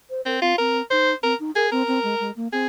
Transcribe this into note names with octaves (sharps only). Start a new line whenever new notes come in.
C5
C4 A#4
C4 F4
C4 A#4
D#4 C5
C4 A#4
D#4
G#4 A#4
C4 A#4
C4
G#3
G#3
A#3
C4 G#4